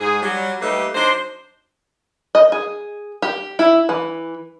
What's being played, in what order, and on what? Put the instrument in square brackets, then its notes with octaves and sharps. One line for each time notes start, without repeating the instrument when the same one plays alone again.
[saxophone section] G#2 G#4
F#3 G3
G3 A3 A#3 D#4 G4 B4
F#3 D4 D#4 C5
[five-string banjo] D#5
G#4
G4
E4
E3